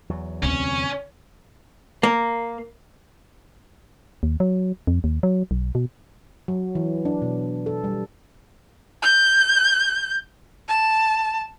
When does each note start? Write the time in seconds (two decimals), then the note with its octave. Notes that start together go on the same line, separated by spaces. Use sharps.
0.09 E2 F#3
0.43 D2 C3 C#4
2.03 A#3
4.23 D#2
4.40 F#3
4.87 F2
5.04 D#2
5.23 F#3
5.51 B1
5.75 B2
6.48 F#3
6.75 E3
7.05 D4
7.22 B2
7.66 A4
7.84 G3
9.02 G6
10.68 A5